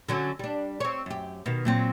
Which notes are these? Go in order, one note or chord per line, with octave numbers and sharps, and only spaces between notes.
D3 F#3 C#4
G3 D4
C4 C#5
F#2 G4
B2 D#3
A#2 F#3 C4